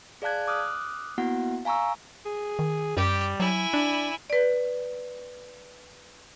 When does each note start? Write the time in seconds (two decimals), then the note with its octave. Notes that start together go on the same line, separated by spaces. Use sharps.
0.22 G#4 D5 F5 A5 F#6 G#6
0.48 D6 D#6 F6 F#6
1.18 A#3 B3 E4 F#4 F#5
1.65 F5 G#5 A#5 C#6 E6
2.26 G#4
2.59 D#3
2.97 F#2 G3 G4
3.40 F#3 E4 G#5
3.74 D4 D5
4.30 B4 D5